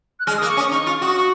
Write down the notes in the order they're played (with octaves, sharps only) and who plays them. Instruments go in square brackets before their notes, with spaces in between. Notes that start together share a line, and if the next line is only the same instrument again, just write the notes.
[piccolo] F#6
[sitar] G#3 [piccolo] F6
[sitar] A#3 [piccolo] D#6
[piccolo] C#6
[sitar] C#4
[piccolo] D#6
[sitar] D#4 [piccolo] C#6
[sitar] F4
[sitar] F#4 [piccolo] D#6
[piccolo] C#6